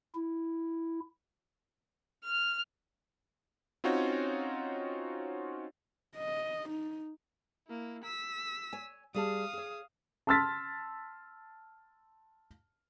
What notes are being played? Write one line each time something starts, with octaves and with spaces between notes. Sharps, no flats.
E4
F6
C4 C#4 D#4 F4 F#4 C#5
D#5
D#4
A#3 E4
E6 B6
C#5 G#5
G3 G#4 F5 A5 D#6
G#4 C#5
A5 C6 E6 F6 A6 B6